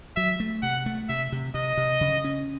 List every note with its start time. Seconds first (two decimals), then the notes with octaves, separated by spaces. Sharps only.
0.17 F#3 E5
0.40 A3
0.63 C3 F#5
0.86 A3
1.09 C3 E5
1.32 C3
1.54 C3 D#5
1.77 C3
2.01 C#3
2.24 C#4